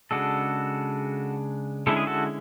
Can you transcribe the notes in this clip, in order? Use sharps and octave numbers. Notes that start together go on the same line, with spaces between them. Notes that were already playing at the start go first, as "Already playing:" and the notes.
C#3 G#3 D4 F#4 A4
D3 G#3 C#4 E4 A4
G#4
F#4 A4